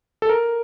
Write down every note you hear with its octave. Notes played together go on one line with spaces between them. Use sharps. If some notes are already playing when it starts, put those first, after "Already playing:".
A4
A#4